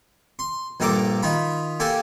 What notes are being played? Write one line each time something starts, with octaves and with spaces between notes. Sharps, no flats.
C6
A#1 G2 A4 A#4 A#5 D6
D#3 F4 B5
A#3 G4 A4 G#5